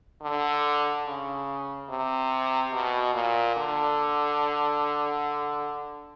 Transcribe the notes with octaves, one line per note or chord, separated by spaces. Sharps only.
D3
C#3
C3
B2
A#2
D3